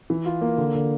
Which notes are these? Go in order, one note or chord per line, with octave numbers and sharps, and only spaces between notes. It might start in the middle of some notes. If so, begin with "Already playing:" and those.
E3
F4
A#3
D3
D3